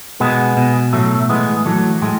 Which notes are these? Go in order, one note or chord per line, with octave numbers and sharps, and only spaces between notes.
B2 G#3 B3
B2
A2 F#3 A3
E3 G#3 B3
E3 F#3 A3
A2 G#3